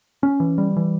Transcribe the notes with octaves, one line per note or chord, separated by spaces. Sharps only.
C#4
E3
G3
E3